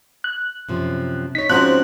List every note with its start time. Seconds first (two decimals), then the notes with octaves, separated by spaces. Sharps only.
0.24 F#6
0.69 F#2 C3 F3
1.35 D#4 C#5 B6
1.50 G#2 F3 C4 C#4 F#4 F#6